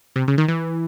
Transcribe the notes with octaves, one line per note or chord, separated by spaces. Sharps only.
C3
C#3
D#3
E3